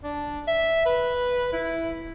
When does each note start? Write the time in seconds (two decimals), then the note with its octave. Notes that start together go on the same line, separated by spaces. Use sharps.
0.04 D4
0.47 E5
0.86 B4
1.53 E4